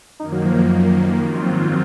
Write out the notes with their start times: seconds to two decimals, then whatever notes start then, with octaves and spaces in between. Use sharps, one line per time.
0.19 F#2 D#3 A#3 D#4
0.32 F#3
0.45 F3
0.58 F3
1.23 G#2 D#3 F#3 C4 F4